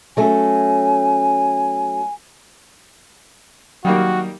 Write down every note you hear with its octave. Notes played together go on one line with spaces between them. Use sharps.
F#3 A3 C#4 G#5
D#3 F#3 G3 A#3 F#4